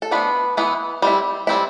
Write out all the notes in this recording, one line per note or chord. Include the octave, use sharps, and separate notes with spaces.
A4
F3 A3 B3 D4 B4
E3 B3 E4
G3 C4 E4
G3 C4 E4